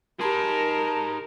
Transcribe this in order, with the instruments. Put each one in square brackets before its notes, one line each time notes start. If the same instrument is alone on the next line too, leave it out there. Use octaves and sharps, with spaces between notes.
[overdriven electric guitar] D#4 G#4 [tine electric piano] G4 B5 C6 [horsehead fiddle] A#4 [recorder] A5